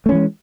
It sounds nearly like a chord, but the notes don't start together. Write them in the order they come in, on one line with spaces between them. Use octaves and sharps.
A3 C#4 E3 G#3